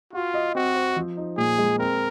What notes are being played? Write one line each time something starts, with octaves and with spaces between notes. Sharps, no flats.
F4 F#4
D#5
C4 F#4
C5
F3
D#4
A#2 G#4
G#3
C4 A#4